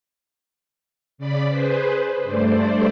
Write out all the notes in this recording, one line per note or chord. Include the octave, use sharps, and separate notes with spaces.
C#3 D5 B5
G#4 B4 C5
G2 A3 C5 D5